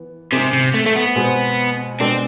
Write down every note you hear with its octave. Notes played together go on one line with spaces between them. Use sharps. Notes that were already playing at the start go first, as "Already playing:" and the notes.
Already playing: E3 B3
G#2 C3 G#3 C4 G#4 C5
C3
A3
A3
B3
B2 G#3 C4 G#4 C5
B2 G#3 C4 D4 A4 D5